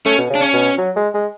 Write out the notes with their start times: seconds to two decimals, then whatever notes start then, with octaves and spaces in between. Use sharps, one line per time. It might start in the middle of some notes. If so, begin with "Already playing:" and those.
0.05 A3 C#4
0.18 B2
0.30 C#3
0.35 D4
0.41 C#4
0.53 B2
0.78 F#3
0.96 G#3
1.14 G#3